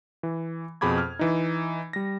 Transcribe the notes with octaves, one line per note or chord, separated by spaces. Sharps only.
E3
F2 B2 G#4 B5 D6 G#6
F6
E3 D#4
G3 A#6